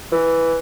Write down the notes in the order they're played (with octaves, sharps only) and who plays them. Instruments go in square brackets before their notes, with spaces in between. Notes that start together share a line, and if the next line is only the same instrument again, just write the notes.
[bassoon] E3